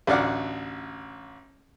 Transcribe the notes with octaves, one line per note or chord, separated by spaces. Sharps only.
A1 D2 D5 F5 F#5